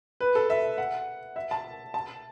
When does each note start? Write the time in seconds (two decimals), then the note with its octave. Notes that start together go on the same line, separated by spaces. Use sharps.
0.20 B4
0.35 A4
0.50 E5
0.78 F#5
1.36 E5
1.51 A5
1.94 A5